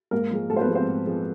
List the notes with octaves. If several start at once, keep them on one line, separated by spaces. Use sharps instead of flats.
G#2 A#3 A#4
F3 G#3
G#2 A3 A4
C5
B3 B4
F3 G#3
C4 C5
G#2
F3 G#3